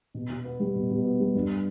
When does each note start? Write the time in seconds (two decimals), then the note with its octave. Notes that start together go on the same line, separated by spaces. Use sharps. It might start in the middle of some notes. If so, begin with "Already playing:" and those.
0.14 B2
0.30 B2
0.44 B3
0.60 G3
0.76 B2
0.90 B2
1.04 B3
1.20 G3
1.35 G2